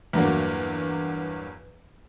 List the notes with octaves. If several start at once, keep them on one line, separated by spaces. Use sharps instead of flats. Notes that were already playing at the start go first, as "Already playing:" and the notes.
E2 G2 F#3 A#3